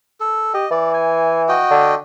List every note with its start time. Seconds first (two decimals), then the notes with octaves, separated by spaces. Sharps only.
0.20 A4
0.54 G4 D#5
0.71 E3 D5
0.94 G#5
1.49 F#4 D#5 G5
1.71 D3